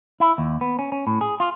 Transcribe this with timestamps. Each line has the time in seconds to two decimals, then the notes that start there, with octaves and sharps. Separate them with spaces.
0.20 E4
0.38 D#2
0.61 B3
0.79 C#4
0.92 C#4
1.07 A2
1.21 G#4
1.40 F4